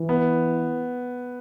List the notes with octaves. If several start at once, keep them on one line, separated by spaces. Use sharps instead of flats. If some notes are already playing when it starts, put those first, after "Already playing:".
Already playing: E3
B3